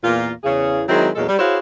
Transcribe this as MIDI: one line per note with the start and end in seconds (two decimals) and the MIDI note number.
0.04 0.31 40
0.04 0.31 46
0.04 0.31 58
0.04 0.31 65
0.44 0.82 40
0.44 0.82 49
0.44 0.82 68
0.88 1.09 51
0.88 1.09 54
0.88 1.09 56
0.88 1.09 60
0.88 1.09 63
0.88 1.09 64
1.15 1.25 40
1.15 1.25 46
1.15 1.25 54
1.15 1.25 56
1.15 1.25 69
1.27 1.39 55
1.39 1.59 64
1.39 1.59 66
1.39 1.59 68
1.39 1.59 72
1.39 1.59 73
1.39 1.59 77